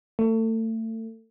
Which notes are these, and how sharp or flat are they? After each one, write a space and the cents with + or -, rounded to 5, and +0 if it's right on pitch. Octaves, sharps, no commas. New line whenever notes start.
A3 +30